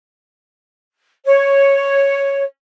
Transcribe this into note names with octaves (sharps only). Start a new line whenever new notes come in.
C#5